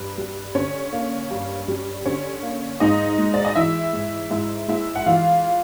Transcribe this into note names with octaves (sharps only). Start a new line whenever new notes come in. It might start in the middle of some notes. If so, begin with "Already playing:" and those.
Already playing: G2 B4
G3
D3 C#4 C#5
A#3
G2
G3
D3 C#4 C#5
A#3
G#2 D#4 D#5
G#3
D5
D#5
E3 E4 E5
G#2
G#2 E4 E5
G#3 E4 E5
F#5
E3 F4 F5